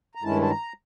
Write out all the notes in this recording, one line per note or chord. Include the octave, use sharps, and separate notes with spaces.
A#5
G2 D#3 G#3 C#4 E4 A5
A5
A#5